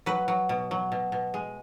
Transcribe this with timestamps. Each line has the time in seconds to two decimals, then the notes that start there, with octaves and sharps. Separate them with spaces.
0.06 F#3 B4
0.28 F#3
0.49 B2
0.71 F#3
0.92 B2
1.12 B2
1.34 G#3